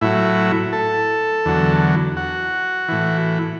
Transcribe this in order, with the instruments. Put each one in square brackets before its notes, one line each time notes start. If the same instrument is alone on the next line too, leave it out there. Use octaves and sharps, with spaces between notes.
[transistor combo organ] A2 F#3 E4
A4
E2 D3 F#3
F#4
A2 E3